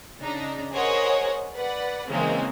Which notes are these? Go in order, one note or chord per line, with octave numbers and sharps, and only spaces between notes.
C#3 D4 D#4 A#5
G#4 A#4 C5 C#5 D#5 F#5
B4 D5 F#5
C#3 E3 G#3 A#3 C4